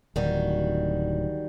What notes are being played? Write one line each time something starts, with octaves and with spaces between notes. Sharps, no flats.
D1 D#3 G3 F#4